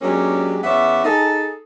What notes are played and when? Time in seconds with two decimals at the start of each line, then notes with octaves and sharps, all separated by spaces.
0.02 F#3 G#3 A#3 C#4 D4 G4
0.63 E2 B3 C#4 D5 E5
1.04 D#4 G#4 A4